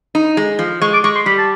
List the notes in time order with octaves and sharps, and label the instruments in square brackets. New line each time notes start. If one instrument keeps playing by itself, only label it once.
[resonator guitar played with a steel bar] D#4
G#3
F3
[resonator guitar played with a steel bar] G#3 [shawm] C#6
[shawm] D6
[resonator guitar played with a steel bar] G#3 [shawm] C#6
[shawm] C6
[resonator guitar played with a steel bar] G3 [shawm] B5
[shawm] A5